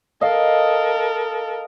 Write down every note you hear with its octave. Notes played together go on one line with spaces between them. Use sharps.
A4 A#4 D#5 F5